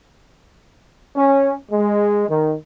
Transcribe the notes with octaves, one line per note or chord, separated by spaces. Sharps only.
C#4
G#3
D#3